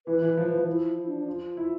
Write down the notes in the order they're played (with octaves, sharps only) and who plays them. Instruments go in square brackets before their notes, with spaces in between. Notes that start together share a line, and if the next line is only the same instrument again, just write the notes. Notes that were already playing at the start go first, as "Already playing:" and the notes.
[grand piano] E3 [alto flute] B4
[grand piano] E3
F3
E3
F3
[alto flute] E4
E4
D4
D4
F4
[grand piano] E4